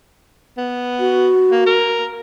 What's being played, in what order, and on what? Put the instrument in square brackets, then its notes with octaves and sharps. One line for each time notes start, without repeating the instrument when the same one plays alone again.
[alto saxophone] B3
[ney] F#4
[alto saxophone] A#3
A#4